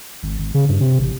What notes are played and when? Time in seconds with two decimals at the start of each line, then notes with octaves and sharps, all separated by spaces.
0.23 G#1
0.39 G#1
0.54 C#3
0.69 G2
0.80 C3
0.99 A1